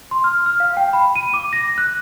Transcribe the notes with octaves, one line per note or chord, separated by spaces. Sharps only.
C6
F6
F6
F5
G5
B5
D#7
D6
A#6
F#6